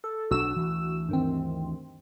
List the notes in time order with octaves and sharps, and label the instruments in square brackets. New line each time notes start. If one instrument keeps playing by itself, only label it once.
[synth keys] A4
[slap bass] B1 D4 [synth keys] F#4 E6 E7
[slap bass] D2 E3
[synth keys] G2 D#3 C4